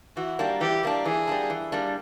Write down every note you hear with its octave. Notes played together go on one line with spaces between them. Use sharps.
E3 F#4
G3 A#3 D4
E3 G4
G3 A#3 D4
E3 G#4
G3 A#3 D4
E3
G3 A#3 D4